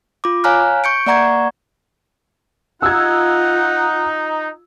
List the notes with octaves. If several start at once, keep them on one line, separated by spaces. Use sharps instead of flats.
F4 D6
C#5 F5 G#5 A#5 F6 F#6
C#6 G6 C#7 D7
A#3 D5 F#5 A#5 C#6 G#6
D#4 F4 F#5 E6 G#6